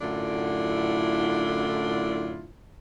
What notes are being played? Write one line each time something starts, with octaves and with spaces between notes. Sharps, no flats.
F#2 A2 D3 D4 E4 F4